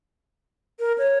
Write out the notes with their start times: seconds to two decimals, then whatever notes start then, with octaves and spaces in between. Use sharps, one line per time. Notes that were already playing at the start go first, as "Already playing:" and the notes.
0.79 A#4
0.98 C#5